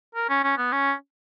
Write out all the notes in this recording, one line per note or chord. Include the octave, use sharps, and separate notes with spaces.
A#4
C#4
C#4
B3
C#4